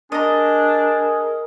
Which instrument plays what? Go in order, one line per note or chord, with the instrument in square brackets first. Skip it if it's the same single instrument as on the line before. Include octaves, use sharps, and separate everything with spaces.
[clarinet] D4 [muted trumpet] G#4 [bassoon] A#4 [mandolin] D#5 A#5